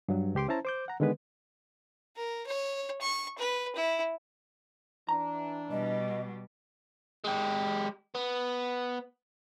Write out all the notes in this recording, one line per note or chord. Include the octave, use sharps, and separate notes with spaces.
G2 F#3
C#2 G4 C6 D6
C#4 E4 C5 A5 A#5
C5 D6 G6
F#5 A#5
D3 D#3 G#3 B3 B4
A#4
C#5
C#6
B4
E4
E3 D4 A#5
B2 G3 D#5
G#3 G4
B3